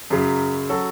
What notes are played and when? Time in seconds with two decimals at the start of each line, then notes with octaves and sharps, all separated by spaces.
0.10 F#2 C#3 F#3
0.69 F#3 C#4 F#4 A4